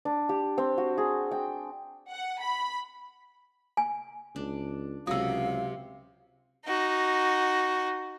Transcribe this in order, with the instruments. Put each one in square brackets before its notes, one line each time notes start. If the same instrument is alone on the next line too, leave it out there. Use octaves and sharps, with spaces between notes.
[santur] D4
G4
C4
F#4
G#4
G5
[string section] F#5
B5
[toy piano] G#5
[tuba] C#2 [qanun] D4
[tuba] C#2 [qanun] C3 F#3 [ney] F5 [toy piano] D#6 E6
[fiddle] D#4 F#4